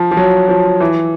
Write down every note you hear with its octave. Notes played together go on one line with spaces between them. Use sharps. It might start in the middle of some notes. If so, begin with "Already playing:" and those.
Already playing: F3
F3
F#3
F3
E3